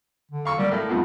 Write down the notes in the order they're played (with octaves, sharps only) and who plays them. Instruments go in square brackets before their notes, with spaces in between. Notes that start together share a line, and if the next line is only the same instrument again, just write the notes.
[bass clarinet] D3
[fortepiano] F5 C#6 E6
[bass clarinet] G3 [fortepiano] A#3
[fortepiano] A2 A#3 [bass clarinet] A3
[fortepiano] F2 G#2 B3 [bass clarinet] F4